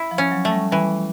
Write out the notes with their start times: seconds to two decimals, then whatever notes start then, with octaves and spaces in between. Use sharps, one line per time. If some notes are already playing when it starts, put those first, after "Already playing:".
Already playing: E4
0.11 F3
0.18 C#4
0.31 F#3
0.45 A3
0.52 G3
0.71 E3 G3